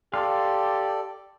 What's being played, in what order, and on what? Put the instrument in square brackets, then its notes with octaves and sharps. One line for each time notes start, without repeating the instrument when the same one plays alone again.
[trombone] G4 [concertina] A4 D5 [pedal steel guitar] F5 C6 F6